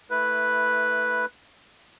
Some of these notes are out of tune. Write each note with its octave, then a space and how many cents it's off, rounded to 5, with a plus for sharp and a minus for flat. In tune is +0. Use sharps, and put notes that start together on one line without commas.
A3 +10 E4 +0 B4 +0